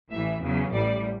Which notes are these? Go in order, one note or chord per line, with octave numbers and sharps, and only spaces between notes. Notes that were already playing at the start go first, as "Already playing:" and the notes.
A1 A2 E3 E5
E2 C#3 F#3
A1 A2 G3 D5